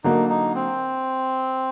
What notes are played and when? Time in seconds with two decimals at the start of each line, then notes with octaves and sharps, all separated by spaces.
0.04 D3 F#3 A#3 D#4
0.30 D#4
0.55 C4